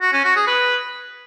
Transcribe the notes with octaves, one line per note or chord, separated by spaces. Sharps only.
F#4
C#4
F#4
G#4
B4